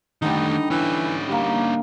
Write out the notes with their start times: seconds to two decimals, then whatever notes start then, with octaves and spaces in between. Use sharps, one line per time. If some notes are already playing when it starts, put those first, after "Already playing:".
0.22 D3 D#3 G3 A3 D#4
0.70 E3 C#4 D#4
1.28 D3 G3 A#3